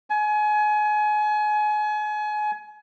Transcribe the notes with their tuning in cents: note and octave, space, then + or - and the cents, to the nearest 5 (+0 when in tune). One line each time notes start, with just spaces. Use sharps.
G#5 +30